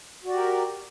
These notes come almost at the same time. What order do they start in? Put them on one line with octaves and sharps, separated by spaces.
F#4 D5 G4 A#4